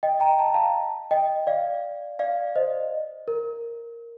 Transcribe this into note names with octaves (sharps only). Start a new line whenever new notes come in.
D#5 G5
G5 A#5
A5
A#5
F5 A5
D#5 G5
D5 F5
D5 F5
C5 D#5
A#4